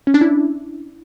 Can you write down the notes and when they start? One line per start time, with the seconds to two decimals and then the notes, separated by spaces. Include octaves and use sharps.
0.07 C#4
0.14 D4
0.21 E4